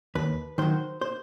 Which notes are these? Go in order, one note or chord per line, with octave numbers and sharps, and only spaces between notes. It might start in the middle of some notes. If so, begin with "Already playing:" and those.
D#2 B4
D#3 F#3 C5
C5